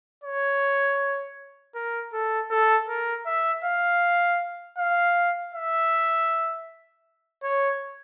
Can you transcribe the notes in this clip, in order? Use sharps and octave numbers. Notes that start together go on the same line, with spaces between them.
C#5
A#4
A4
A4
A#4
E5
F5
F5
E5
C#5